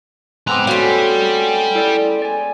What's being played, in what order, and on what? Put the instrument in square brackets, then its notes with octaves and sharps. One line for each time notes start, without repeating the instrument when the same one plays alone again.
[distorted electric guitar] G#2 A#5 [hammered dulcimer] G#3 B3 C4 [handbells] D6 E6 F#6
[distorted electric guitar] G3 [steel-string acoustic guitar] A3 C#4 [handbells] F#4 F5
[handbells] E4 A4 D5
D5 G#5